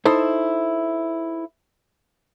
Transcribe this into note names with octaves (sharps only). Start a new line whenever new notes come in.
D#4 E4 A4 C5